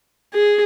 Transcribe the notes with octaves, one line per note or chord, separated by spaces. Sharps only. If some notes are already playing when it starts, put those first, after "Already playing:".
G#4